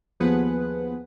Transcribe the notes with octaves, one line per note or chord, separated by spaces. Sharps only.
D#2 F3 B3 G#4 B4 F#5